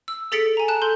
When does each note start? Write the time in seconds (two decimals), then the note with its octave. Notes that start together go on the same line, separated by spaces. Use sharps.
0.08 E6
0.32 G#4 A4 A6 B6 C#7 D7
0.57 G#5 A#5
0.68 A5 F#6 E7
0.82 A4 C6 G6